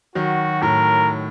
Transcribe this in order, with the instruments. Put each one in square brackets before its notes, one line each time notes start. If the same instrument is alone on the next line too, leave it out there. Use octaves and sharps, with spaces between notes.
[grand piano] D#3 F#3 [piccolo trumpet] F#4
[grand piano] A2 [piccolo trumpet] A#4